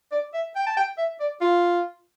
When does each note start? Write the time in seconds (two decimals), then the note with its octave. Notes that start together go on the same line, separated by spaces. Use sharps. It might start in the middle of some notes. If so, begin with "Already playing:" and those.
0.12 D5
0.34 E5
0.56 G5
0.67 A5
0.77 G5
0.98 E5
1.20 D5
1.41 F4